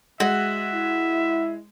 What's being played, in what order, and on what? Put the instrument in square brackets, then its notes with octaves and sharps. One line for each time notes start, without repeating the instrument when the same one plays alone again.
[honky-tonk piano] G#3 [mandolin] F#4 [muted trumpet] E5
[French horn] E4